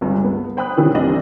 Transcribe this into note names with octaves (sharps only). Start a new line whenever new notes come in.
G1 C#2 G2 G#3
B3
C5 G5 B5 D#6 F#6
B2 D#3 E3 G3 C#4
C2 C4 D4 D5 D#5 F#7